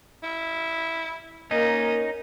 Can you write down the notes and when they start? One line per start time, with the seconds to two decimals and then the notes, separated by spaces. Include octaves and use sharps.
0.23 E4
1.51 A#3 C#4 D#4 A#4 D#5